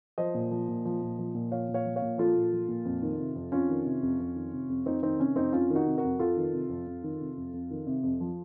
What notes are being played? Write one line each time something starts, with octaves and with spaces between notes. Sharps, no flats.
F3 C5 D#5
A#2
F3
A#2
F3
A#2
F3
A#2
F3 C#5 F5
A#2
C#5 F5
F3
C#5 F5
A#2
F3 F4 A4
A#2
F3
A#2
F2
D#3
C3
F2
F2 C#4 F4
D#3
C3
F2
F2
D#3
C3
F2
F2 C4 D#4
D#3 C4 D#4
C3 C#4
F2 C4 D#4
F2 C#4 F4
D#3
D#4 F#4
C3
F#4 A#4
F2
F2 F4 A4
D#3
C3
F2
F2
D#3
C3
F2
F2
D#3
C3
F2
F3